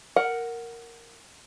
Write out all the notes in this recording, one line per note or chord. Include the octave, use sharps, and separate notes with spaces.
A#4 F#5